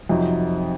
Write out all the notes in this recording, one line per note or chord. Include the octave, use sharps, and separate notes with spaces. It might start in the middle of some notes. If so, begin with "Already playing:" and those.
F2 C3 F#3 C4 D#4